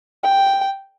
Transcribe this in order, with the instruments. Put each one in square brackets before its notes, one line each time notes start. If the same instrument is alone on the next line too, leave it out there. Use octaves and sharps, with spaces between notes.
[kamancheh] G5